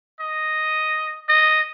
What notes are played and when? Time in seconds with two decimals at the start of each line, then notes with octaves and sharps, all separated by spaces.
0.20 D#5
1.29 D#5